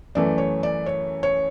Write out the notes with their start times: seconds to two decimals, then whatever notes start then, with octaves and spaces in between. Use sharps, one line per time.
0.15 F#2 E3 A3 D5
0.38 C#5
0.63 D5
0.86 C#5
1.23 C#5